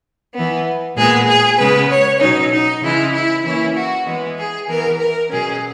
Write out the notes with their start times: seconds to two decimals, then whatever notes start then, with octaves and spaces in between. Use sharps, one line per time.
0.34 E3 B3
0.96 A#2 G#3 B3 G#4
1.27 G#4
1.58 C#3 G#3 B3 B4
1.89 C#5
2.20 B2 F#3 C#4 D#4
2.51 D#4
2.82 C#3 E3 G#3 E4
3.13 E4
3.44 E3 A#3 C#4 E4
3.75 F#4
4.06 E3 G#3 B3
4.37 G#4
4.68 E3 B3 A#4
4.99 A#4
5.30 B2 F#3 C#4 G#4